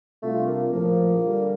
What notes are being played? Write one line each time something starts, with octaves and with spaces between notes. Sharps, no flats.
C3 G3 A3 D4 F4
A#3
A#1 A2 F3 A#3
D3 G3